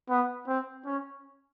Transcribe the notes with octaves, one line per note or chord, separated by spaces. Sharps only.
B3
C4
C#4